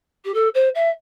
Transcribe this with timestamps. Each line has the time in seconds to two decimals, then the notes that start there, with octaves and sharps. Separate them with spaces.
0.25 G4
0.34 A4
0.54 C5
0.75 E5